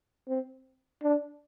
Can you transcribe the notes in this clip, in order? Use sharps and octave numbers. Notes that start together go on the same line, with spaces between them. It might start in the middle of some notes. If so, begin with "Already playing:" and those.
C4
D4